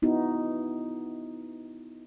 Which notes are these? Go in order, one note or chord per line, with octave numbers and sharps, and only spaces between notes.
B3 D#4 E4 F#4